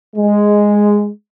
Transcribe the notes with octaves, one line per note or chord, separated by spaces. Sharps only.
G#3